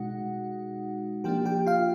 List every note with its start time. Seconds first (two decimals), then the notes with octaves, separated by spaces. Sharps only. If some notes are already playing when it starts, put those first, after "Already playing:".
Already playing: B2 G#3 D#4 F#4 F#5
1.24 F3 A#3 D4 G4 G5
1.45 G4 G5
1.67 F4 F5